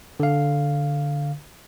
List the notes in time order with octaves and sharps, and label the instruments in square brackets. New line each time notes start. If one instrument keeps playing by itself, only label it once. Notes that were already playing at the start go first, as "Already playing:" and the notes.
[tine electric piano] D3 F5